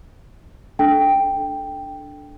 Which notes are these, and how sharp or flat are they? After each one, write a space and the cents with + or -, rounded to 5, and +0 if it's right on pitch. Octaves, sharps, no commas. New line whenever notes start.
D4 +0 A4 -10 G5 +0